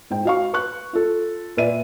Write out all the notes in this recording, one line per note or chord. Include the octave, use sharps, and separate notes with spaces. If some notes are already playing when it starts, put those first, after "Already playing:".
G#2 G5
F#4 F5 C#6
B4 C#6 F#6
F4 A4
A#2 B4 D5 E5 D#7